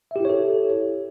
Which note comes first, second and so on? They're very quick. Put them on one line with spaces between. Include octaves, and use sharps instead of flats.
E5 G4 E4 C#5 A4